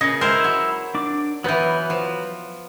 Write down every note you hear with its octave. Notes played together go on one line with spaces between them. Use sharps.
A#2 C#3 D#5
G#3 E4 A#4 C5
F#3
D4 D6
E3 F#3 B3 B4 G6
F3